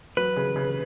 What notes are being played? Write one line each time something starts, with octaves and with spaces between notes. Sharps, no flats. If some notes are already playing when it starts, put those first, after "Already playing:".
F#3 B4
C#3
C#3